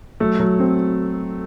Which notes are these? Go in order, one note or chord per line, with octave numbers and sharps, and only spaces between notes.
F#3 A3
F#3
C4